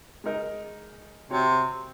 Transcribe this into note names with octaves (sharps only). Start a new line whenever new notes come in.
G#3 D#4 A#4 D#5
C3 C4 F#4 C#5